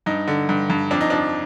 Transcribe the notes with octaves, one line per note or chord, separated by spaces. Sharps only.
G2 D#4
D3
G2
G2
F2 D4
D#4
F3 D4